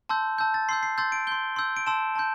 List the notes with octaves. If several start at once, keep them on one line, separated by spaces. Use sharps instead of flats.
A5 C6 E6 G6
A5 E6 G6
A6
C6 E6 G6 C7
C7
C6 E6 G6 A6
D7
C6 G6 G7
C6 E6 G6
D7
A5 C6 E6 E7
A5 C6 G6